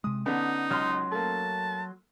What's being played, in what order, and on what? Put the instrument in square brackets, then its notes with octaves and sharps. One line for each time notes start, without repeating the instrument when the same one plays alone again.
[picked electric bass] C3 G#3 [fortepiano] D#6
[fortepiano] D3 B3 [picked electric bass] C#4 [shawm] D#4
[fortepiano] C#2 F6 [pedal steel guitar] F#3 C6
[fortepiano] A3 A#3 [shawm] A5